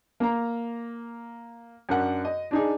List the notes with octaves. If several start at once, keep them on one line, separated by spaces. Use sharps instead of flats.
A#3 A#5
F#2 D4 A#4 F#5
D#5
D4 D#4 G#4